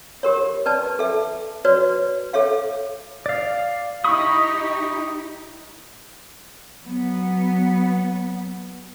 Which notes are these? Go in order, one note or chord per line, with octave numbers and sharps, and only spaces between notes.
G4 A#4 C#5
B4 D5 A5
A4 E5
F#4 B4 C#5 D5
A4 C#5 E5 F5
D5 F5
D#4 E4 G4 B5 C#6 D#6
F#3 B3